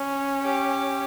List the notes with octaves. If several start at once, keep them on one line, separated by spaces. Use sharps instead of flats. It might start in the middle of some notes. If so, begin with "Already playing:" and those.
Already playing: C#4
G4